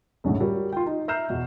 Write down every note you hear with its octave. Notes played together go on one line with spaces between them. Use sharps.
C#2 F#2 A2 D3
G3 F#4 A#4 C#5
F4 G5
D#4
E5 A#5 F6 G6 C7 E7
E2 B2